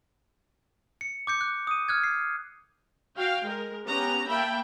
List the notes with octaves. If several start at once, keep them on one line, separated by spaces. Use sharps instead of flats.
C#7
D6 G6 C#7
F#6
D#6 D#7
F6 F#6 G#6
C7
F#4 F5 G5
G#3 A#4
B3 C#4 G4 A#5
A#3 E5 G5 A5 B5